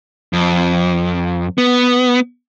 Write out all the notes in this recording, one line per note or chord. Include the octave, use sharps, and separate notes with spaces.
F2
B3